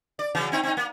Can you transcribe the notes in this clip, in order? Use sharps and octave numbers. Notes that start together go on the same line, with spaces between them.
D5
C#3 E3 F#3
C4 D#4 E4
C4 D#4
A#3